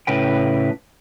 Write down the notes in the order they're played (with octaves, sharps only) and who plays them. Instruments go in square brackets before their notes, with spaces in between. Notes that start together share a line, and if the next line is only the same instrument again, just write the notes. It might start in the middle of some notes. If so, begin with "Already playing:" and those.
[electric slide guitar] A2 C#3 B4 G5